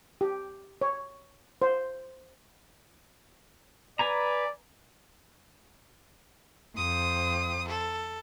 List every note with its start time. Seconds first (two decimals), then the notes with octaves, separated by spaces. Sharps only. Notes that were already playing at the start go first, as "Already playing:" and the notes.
0.21 G4
0.81 C#5
1.62 C5
3.99 B4 D5 G#5 A#5
6.77 F2 C5 D#6
7.69 A4